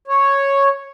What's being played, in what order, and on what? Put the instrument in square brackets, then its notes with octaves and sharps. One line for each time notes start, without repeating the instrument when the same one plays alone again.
[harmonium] C#5